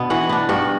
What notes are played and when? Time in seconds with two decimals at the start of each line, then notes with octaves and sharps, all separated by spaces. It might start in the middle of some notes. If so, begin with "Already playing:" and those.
Already playing: B2 B3 D4
0.10 E3 F#4 F#5
0.29 B3 D4
0.49 G2 F#4 F#5